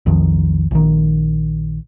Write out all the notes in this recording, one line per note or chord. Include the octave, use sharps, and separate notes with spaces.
B1 F2 D#3 F3
A#1 D#3